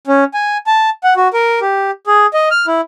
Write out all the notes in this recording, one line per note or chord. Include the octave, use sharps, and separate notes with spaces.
C#4
G#5
A5
F#5
F#4
A#4
G4
G#4
D#5
F6
E4